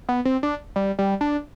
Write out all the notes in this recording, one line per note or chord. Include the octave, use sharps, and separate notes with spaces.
B3
C4
D4
G3
G3
D4